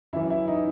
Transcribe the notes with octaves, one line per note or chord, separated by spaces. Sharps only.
F#2 E3 E4
E4
D#4